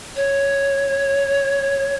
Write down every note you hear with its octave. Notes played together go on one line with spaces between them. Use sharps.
C#5